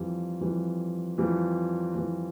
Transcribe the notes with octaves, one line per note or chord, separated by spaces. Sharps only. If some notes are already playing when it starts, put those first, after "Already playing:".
Already playing: F2 E3 G3
F2 E3 G3
F2 E3 G3
F2 E3 G3